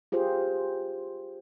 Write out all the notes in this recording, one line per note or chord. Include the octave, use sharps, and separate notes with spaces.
F4 G4 G#4 C5